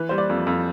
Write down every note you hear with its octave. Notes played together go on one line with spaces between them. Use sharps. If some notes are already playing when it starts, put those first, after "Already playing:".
Already playing: E3 B4
G3 C5
D5
F2
F2